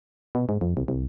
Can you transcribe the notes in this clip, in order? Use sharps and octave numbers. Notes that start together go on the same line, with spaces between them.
B2
G#2
F2
C2
C2